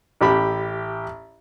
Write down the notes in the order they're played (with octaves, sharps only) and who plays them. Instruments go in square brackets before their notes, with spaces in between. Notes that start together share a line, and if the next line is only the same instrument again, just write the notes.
[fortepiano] A1 G4 B5